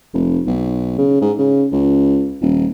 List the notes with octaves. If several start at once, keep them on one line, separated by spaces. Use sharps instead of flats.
F1
B1
C#3
G#2
C#3
C#2
D#1